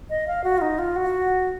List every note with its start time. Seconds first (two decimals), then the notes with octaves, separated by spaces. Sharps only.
0.10 D#5
0.27 F5
0.44 F#4
0.58 F4
0.61 D#4
0.79 F4
0.96 F#4